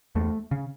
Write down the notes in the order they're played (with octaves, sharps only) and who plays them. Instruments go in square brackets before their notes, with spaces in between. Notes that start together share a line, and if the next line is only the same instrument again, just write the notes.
[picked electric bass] E2 A3
C#3